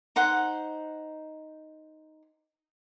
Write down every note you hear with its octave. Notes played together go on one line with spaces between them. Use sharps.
D#4 C5 F#5